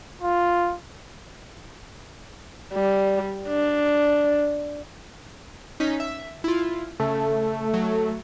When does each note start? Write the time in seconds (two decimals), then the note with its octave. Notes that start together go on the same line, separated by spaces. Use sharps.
0.22 F4
2.73 G3
3.48 D4
5.80 C#4 D#4 B6
6.00 E5
6.44 E4 F4
7.00 C#3 A3
7.74 F#3